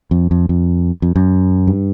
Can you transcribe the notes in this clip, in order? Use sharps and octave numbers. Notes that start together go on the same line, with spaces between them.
F2
F2
F2
F2
F#2
G2